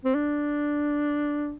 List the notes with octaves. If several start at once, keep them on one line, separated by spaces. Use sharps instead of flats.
C4
D4